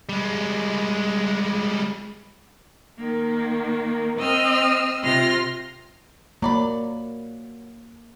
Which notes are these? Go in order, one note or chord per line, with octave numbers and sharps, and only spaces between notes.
G3 G#3
D#3 A#3
C4 D#5 E6 F6
C3 F4 C6 F6 A#6
F#3 A#3 D5 B5